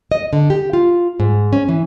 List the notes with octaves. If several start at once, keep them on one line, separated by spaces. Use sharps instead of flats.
D#5
D3
G4
F4
G#2
C#4
E3